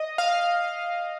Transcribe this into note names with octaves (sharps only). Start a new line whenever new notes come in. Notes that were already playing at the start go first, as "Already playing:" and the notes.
Already playing: D#5
F5